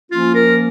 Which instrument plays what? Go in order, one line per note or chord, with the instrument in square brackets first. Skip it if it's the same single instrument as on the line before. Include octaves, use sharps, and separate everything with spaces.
[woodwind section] F3 A#3 C#4 F4
A#4